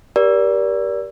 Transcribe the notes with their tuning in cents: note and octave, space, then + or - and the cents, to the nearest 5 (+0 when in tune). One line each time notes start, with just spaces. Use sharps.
G4 +0 A#4 +30 D5 -20